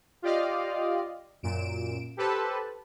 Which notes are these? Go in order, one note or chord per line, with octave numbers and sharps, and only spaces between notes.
F4 G4 D5 D#5 F5
F#2 A#2 D7 E7
G4 A4 B4 C5 A5